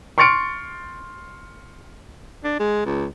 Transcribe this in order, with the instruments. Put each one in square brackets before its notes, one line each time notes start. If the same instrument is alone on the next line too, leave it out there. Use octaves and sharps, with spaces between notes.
[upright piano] C6 C#6 F6 A6 C#7 D7
[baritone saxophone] D4
G#3
C#2